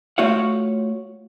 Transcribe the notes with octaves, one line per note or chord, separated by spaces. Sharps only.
A3 F4 F#4 C#5 F5 F#5